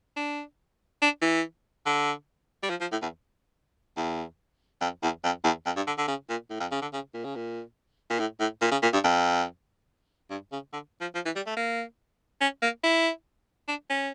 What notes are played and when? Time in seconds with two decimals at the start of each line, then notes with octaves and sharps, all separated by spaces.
0.16 D4
1.02 D4
1.22 E3
1.86 D3
2.63 G3
2.70 F3
2.81 F3
2.92 A2
3.02 E2
3.97 E2
4.81 F2
5.03 E2
5.24 F2
5.44 E2
5.66 F2
5.77 G2
5.87 D3
5.98 D3
6.08 C#3
6.29 A#2
6.50 A2
6.60 F2
6.72 C#3
6.82 D3
6.93 C#3
7.14 A#2
7.24 C#3
7.36 A#2
8.10 A#2
8.19 A2
8.40 A2
8.61 A#2
8.71 C#3
8.82 A#2
8.93 G2
9.04 F2
10.30 G2
10.52 C#3
10.73 D3
11.01 F3
11.15 F3
11.25 E3
11.36 G3
11.46 A3
11.57 A#3
12.41 C#4
12.62 A#3
12.83 E4
13.68 D4
13.90 C#4